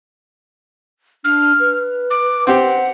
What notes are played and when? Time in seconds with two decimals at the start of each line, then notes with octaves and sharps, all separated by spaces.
1.25 D4 F6
1.60 B4
2.10 D6
2.47 C4 G4 F#5